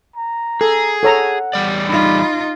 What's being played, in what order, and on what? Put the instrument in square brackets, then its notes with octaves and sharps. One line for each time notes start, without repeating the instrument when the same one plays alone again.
[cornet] A#5
[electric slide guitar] G#4 [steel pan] A4
[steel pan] A4 C#5 A#5 [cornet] F#5
[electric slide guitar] E2 G3 D5
[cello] D#4 F4 [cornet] B5